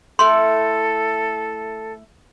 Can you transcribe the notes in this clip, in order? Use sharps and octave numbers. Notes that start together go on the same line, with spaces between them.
A3 E4 A4 C6 F6